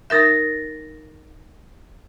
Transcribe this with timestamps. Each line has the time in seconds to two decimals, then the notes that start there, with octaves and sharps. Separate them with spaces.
0.10 D#4 A#4 E5 G6 A6 A#6